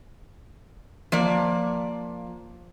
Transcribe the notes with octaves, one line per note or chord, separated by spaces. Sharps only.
F3 A#3 D5